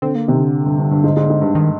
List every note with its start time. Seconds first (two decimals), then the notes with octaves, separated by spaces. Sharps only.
0.02 D3 C4
0.15 A#3
0.28 C3 D#3
0.41 D3
0.66 G2
0.79 G2
0.91 G2
1.04 G#2
1.17 G#2
1.30 G#2
1.42 G2
1.55 D#3